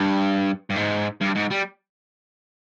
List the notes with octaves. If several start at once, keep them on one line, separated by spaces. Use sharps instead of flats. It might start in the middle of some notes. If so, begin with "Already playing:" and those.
Already playing: G2
G2
G#2
G2
G#2
G3